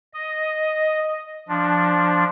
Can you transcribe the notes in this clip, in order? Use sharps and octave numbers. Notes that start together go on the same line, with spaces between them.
D#5
F3 D4